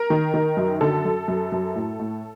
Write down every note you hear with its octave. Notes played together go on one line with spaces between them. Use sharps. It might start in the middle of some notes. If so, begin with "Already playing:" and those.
Already playing: A#4
D#3
D#3
F#2
D3 A4
F#2
F#2
F#2
A2
A2